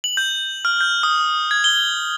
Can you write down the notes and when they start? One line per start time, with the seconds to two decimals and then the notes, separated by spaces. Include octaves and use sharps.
0.04 F#7
0.17 G6
0.65 F6
0.81 G6
1.03 D#6
1.51 G#6
1.64 G7